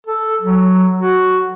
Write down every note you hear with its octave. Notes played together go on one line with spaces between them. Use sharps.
A4
F#3
F#4